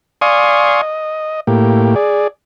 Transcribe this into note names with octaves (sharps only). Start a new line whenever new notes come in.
D5 F5 G#5 C6 C#6 D#6
D#5
A2 A#3 G4
G#4 D5